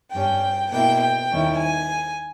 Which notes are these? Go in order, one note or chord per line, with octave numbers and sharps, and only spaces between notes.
G2 G3 C#4 G5
B2 A#3 E4 G5
G5
D#2 D#3 G3 C#4 E4
G#5